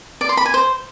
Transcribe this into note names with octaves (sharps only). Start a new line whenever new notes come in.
D5
C6
B5
G#5
C5